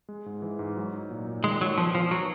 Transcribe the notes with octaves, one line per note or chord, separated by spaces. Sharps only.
G#3
G#2
E3
G#2
F#3
D#4
A#2
A#2
D#3 G#3
D#3 F#3
F3 B3
F3 B3
F#3 B3